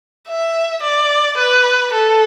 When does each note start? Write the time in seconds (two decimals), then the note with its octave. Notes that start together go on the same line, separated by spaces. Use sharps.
0.29 E5
0.84 D5
1.38 B4
1.93 A4